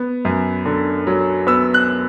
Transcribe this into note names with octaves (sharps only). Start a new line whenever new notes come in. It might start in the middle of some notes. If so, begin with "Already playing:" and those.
Already playing: B3
F#2
D3
F#3
B3 E6
F#6